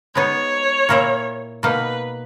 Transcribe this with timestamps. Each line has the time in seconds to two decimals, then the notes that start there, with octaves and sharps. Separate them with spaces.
0.15 G#3 B3 D#4 C#5
0.89 A#2 A#3 E4 A#4
1.63 B2 A#3 D#4 B4